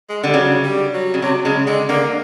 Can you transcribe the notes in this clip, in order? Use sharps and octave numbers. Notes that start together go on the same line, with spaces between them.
G#3
D3 G3
C#3 F#3
G3
F#3
C#3
C3 F#3
C#3 G#3
D3 G#3
D3 A#3